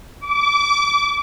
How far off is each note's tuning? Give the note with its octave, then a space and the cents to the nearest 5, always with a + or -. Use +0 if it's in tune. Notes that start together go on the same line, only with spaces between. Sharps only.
D6 -30